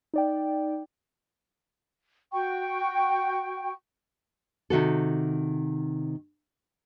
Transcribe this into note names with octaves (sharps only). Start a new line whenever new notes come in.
D#4 D5 G5
F#4 G5 C#6
C3 D#3 F#4 A4